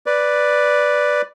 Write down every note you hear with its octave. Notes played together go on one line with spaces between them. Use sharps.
B4 D5